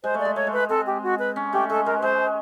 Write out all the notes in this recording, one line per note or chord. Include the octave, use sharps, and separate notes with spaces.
G#3 C5
A3
D5
G#3
A3 C#5
G#3
B4
C4 A4
G4
F#4
B4
C#4
A3 G4
G#3 A4
G#3 A#4
B4
G#3 C5